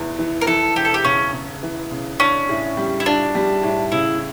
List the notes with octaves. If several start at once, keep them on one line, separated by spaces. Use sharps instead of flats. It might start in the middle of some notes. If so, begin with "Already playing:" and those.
Already playing: F1 E2 E3
E3
A#4
E3 A4
E1 G4
A4
G4
C#3 C#4
C#3
E3
C#3
C#4 D4
A2
G3
E4
D4 F4
G3
A2
C#3 E4